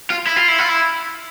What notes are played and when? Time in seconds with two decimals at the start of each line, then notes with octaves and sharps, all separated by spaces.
0.10 F4
0.27 E4
0.37 F4
0.48 E4
0.59 F4
0.69 E4